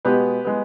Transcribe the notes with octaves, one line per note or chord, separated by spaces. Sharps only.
B2 G#3 B3 G4 B4
G#3 B3